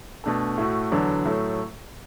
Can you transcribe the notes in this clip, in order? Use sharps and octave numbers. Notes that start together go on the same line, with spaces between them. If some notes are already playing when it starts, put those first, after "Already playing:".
B2 A3 D4 A4
A2 A3 F#4
E2 D3 F#3 D4
A2 F#3 A3